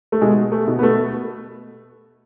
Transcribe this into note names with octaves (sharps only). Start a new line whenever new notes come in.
A3
B2 G#3
A3
B2
B3
A3